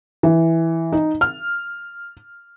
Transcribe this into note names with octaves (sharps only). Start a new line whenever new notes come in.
E3
D#4
F6